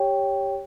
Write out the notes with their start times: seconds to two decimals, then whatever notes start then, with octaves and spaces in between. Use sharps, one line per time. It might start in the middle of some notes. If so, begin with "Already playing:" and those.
Already playing: G4 C#5 G5